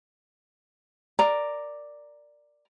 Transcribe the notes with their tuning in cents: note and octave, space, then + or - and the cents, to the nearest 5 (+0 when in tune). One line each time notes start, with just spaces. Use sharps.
A#4 +0 D5 +5 A#5 +0